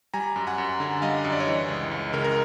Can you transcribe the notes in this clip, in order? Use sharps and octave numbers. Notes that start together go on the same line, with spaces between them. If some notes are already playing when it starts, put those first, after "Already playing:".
G3 G#5 A#5
F#2
F#5 G#5
F#2
D3
G3 D#5 F5
F#2 D#5
D5
C#5 D#5
E3
C#2
C#2
C#3 A#4
A#4